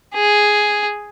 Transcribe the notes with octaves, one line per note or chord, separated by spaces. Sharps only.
G#4